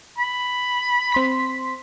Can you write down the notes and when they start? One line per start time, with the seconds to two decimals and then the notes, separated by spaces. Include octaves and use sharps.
0.18 B5
1.12 C4 C6 B6